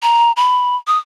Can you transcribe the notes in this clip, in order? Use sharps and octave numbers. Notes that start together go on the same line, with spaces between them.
A#5
B5
D#6